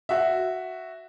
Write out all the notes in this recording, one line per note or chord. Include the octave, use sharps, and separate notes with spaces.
F#4 E5